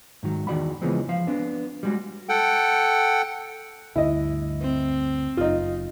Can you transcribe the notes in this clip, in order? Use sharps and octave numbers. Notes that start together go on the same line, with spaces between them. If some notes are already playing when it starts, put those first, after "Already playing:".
G#2 D#3 F#3
E2 D#3 F#4 D5 F#5 B5
C#3 E3 F3 G#3 B3 C4
F3 F5
B3 C4 D4
G3 G#3 F#4
A4 F#5 G5
D2 G2 D3 E4 D#5
C4
F#1 F#2 D#4 F4